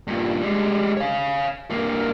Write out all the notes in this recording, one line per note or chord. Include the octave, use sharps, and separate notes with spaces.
G2 A#2
G3 G#3
C#5 F5
G2 A#3